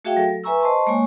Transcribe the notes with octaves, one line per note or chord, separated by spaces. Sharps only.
A3 F#4 G#4 E5 F5 G5
F#3 A4
B4 E5 G#5 A#5 C#6 E6
C5 D#5 A5 C6 C#6
G#3 A#3 C#5 G#5 C#6